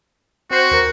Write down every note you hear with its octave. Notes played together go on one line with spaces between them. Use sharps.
C4 F#4 C5
D#2 A#4